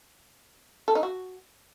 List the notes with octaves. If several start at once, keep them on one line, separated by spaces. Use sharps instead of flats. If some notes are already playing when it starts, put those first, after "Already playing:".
A4
D#4
F#4